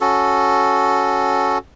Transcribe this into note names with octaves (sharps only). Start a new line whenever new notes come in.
C#4 F#4 A4